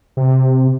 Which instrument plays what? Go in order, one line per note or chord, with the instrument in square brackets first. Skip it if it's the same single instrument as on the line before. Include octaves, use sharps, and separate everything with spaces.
[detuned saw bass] C3